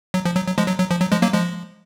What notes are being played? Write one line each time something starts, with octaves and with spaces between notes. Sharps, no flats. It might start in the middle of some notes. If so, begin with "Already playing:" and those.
F#3
F3
F#3
F#3
F3 G#3
F#3
F#3
F3
F#3
F3 G#3
F#3 A#3
F3 G#3